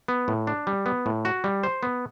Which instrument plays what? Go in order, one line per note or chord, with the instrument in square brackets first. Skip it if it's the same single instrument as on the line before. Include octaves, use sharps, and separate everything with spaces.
[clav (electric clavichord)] B3
A2
D4
G3
B3
A2
F#4
G3
C5
B3